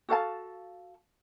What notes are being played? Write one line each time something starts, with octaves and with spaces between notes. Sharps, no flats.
F#4 A4 F5 A5